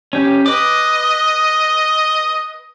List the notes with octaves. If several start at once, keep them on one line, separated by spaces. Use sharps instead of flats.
C#4 G4
B4 D#5 D6